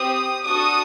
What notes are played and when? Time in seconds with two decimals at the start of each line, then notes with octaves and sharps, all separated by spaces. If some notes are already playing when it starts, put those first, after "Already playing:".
Already playing: C4 G4 D#6
0.44 D4 F#4 A4 D#6